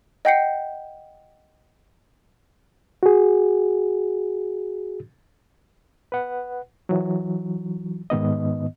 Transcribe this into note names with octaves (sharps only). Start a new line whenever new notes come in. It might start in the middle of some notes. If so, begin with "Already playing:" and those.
D#5 F#5 G5 G6 C7 C#7
F#4 G#4
B4 F#5
E3 F#3
G#2 D#3 B3 D#5